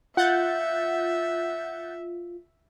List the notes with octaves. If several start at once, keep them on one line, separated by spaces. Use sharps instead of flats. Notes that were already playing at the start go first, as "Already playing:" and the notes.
F4 E5 F#5 G6 A6